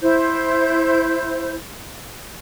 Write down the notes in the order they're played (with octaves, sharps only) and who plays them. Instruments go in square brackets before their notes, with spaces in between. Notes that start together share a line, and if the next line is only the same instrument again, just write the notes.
[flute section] E4 C5 G6